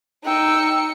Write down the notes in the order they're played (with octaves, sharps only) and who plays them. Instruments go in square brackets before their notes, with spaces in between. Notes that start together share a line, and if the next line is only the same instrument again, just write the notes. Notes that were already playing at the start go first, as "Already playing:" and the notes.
[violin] D#4 C#7 [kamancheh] G5 E6